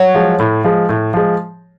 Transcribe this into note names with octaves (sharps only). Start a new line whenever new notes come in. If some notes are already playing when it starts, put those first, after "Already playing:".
Already playing: F#3
F3 G#3
A2
F3 G#3
A2
F3 G#3